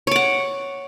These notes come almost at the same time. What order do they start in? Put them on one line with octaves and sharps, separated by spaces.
C#5 D6 F#5